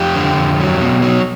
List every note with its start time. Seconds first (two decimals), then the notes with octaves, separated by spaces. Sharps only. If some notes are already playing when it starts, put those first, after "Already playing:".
Already playing: F2 G4
0.15 D3
0.37 F2
0.60 F#3
0.81 B2
1.02 F#3